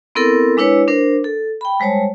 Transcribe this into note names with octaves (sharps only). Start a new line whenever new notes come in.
B3 C4 E4 A4 A#4
G#3 D4 E4 B4 C#5 D6
D4 A#4 C5
A4
G5 B5
G3 G#3 C5 C#5 A5